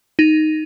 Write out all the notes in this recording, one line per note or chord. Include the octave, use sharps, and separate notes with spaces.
D#4